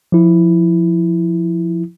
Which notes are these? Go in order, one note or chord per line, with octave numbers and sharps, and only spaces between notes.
F3 E4